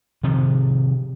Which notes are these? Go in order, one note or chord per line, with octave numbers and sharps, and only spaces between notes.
C3 D#3 F3